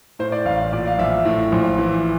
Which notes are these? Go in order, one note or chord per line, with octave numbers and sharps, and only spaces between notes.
A2 C5
D5
A1 F5
A#2 D5
F5
A#1 E5
A2
A#1
E3